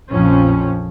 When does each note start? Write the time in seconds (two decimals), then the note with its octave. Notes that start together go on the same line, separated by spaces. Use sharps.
0.11 A#1 F2 F3 C#4